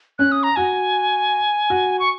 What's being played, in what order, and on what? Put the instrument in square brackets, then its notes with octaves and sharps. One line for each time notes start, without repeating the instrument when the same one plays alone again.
[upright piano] C#4 [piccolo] F#6
[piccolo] D#6
A#5
[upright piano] F#4 [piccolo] G#5
[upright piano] F#4
[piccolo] C#6